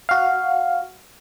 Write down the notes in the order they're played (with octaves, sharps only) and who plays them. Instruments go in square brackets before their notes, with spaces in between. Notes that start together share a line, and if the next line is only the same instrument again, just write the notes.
[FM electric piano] F#4 F5